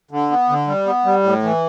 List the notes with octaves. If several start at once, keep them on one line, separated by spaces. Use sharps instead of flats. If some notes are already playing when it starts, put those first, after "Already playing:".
D3
B3
D3
G3
B3
G3
A2
E3